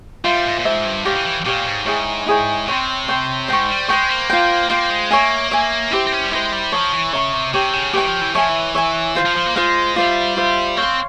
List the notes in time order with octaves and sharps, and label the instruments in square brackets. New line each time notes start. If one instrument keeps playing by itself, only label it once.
[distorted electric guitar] G3 [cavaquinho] F4 C5 E5
[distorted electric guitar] G#2
A#2
[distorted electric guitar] G#2 [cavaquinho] F4 C5 E5
[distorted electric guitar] G2
[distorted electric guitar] G#2 [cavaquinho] G4 C#5 F5
[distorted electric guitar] E3
E3
[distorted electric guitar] A#2 [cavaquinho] G4 C#5 F5
[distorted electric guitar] G#2
[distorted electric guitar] G#2 [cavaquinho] E4 G#4 C#5 G5
[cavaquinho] E4 G#4 C#5 G5
[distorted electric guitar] C3 [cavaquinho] C#5 G5 C6
[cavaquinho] C#5 G5 C6
[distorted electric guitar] G#2 [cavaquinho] C5 G5 C#6
[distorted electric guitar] G3
[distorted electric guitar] G#3 [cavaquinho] C5 G5 C#6
[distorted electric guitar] A#3
[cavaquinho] F4 C5 G5
[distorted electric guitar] A#3 [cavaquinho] F4 C5 G5
[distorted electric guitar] G#3
[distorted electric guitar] A#3 [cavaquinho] C#5 E5 G#5
[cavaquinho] C#5 E5 G#5
[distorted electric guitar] C4 [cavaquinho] E4 G4 C5
[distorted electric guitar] C4
C#4
G3
[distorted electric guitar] G#3 [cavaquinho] E4 G4 C5
[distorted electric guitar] G3
[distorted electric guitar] F3 [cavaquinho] C#5 E5 A#5 C#6
[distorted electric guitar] E3
[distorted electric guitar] C#3 [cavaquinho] C#5 E5 A#5 C#6
[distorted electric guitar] C3
[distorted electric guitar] C3 [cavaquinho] G4 C#5 G5
[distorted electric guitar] C#3
[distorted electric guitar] E3 [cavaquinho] G4 C#5 G5
[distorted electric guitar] F3
E3
[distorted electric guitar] F3 [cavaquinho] C#5 E5 G#5
[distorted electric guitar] E3
[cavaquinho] C#5 E5 G#5
F4 C5 F5
[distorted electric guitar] F3
F3
A#3
[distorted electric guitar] G#3 [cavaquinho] F4 C5 F5
[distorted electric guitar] G3 [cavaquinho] F4 C5 E5
[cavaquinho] F4 C5 E5
[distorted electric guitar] C4 [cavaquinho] C#5 F5 C6